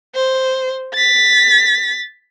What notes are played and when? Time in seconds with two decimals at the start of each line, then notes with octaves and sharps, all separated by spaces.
0.15 C5
0.94 A6 B6